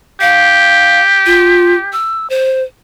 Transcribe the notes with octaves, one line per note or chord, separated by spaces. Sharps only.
G4 F5
F4
E6
C5